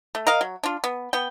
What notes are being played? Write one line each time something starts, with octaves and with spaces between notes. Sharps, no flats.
A3
A#4 D#5 F5
F#3
D4 F4
B3
B3 G5